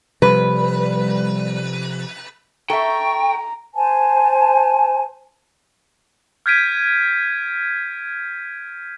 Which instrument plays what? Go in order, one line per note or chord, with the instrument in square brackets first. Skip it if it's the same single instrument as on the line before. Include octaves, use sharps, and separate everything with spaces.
[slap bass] C3 F3 [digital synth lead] G3 [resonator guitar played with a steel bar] B4
[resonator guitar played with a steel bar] A4 E5 [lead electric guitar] G5 [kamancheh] A#5 [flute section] C#6
[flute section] C5 G#5 A5
[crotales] F6 G6 G#6 B6 D7 D#7